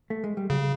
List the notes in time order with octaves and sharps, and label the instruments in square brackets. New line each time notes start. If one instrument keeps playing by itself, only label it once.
[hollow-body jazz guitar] A3
G#3
G3
[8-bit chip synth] C#3 [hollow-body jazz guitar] F#3